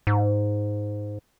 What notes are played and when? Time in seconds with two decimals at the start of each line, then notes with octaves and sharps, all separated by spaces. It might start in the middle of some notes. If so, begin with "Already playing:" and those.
0.07 G#2